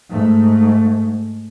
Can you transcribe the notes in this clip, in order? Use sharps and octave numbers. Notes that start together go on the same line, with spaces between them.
G#2 A3